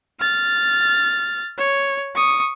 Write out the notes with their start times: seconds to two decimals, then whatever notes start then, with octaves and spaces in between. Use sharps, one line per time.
0.20 F6 A6
1.58 C#5
2.15 C#6 D#6